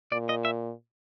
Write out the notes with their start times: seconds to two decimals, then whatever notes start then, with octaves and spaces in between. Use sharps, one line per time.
0.12 A#2 D5
0.29 D#5
0.45 E5